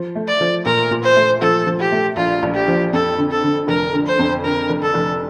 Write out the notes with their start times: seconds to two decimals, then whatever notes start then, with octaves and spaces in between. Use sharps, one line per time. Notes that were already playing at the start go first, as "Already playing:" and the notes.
Already playing: F3
0.15 A3
0.28 D5
0.41 F3
0.66 A#2 A#4
0.91 A#2
1.04 C5
1.16 A3
1.42 F3 A4
1.67 F3
1.80 G4
1.92 A3
2.17 A#1 F4
2.43 A#1
2.54 G4
2.68 F3
2.93 F2 A4
3.18 D3
3.31 A4
3.43 D3
3.68 F1 A#4
3.94 D3
4.06 C5
4.19 F2
4.44 D3 A#4
4.69 F1
4.82 A4
4.94 F1